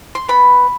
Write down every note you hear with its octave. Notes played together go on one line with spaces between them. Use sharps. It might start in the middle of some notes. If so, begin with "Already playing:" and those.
C6
B3 B5